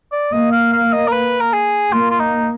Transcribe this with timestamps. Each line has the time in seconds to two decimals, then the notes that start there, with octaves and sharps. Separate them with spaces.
0.12 D5
0.33 A#3 D#5
0.52 F5
0.73 F5
0.93 D#5
1.08 A#4
1.12 B4
1.41 A#4
1.53 G#4
1.93 A#3 F4
2.10 F4
2.20 D#4